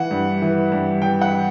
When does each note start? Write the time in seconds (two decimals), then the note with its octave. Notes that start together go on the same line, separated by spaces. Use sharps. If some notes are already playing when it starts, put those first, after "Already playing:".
Already playing: E3 F#5
0.11 G2
0.42 E3
0.72 G2
1.02 E3 G5
1.21 F#5